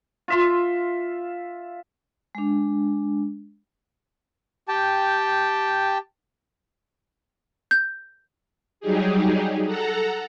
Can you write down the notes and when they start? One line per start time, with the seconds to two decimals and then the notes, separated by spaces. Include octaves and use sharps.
0.28 F4 E5 C6
2.35 G#3 D4
4.68 G4 G5 A5
7.71 G6
8.80 F#3 G3 D#4 G4 G#4
9.66 A4 F#5 A#5